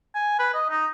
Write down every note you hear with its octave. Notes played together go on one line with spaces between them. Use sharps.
G#5
B4
D#5
D#4